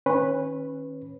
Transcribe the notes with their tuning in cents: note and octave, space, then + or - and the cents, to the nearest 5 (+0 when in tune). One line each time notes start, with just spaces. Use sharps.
D#3 +5 C#4 -25 B4 +0